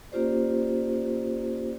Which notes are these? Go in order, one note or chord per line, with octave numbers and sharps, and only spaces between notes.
A#3 C#4 F4 G4 C5 D5